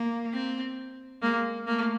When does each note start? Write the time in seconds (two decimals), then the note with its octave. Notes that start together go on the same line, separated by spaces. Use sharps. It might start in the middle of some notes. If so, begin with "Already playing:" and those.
Already playing: A#3
0.33 C4
1.22 G#3 A#3
1.67 A3 A#3